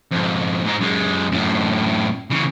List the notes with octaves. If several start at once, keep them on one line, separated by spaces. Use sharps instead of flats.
F2 G#2
G#2 D#4
F#2 G#3
F#2 A2
C#3 E3